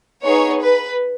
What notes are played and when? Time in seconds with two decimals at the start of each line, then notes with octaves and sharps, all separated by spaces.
0.23 B3 D#4 G#4 C#5
0.62 B4